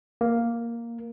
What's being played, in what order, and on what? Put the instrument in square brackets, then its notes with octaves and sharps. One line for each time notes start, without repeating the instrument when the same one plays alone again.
[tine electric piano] A#3